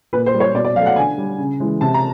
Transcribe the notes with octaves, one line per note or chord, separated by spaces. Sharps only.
A#2 B4
C5
G3
C#5
B2 D5
D5
F#3 A3 F5
F#5
D3 G#5
G3
C#3
E3 G#3
C3 A5
A#5